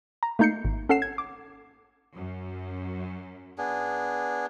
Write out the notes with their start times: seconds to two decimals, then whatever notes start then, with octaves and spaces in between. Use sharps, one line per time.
0.23 A#5
0.39 A3 A#3 D#4 G6 C7 C#7
0.65 G#1
0.89 C#4 A4 F#5 C7 E7
1.02 G#6
1.18 D6
2.16 F#2
3.58 B3 D4 G#4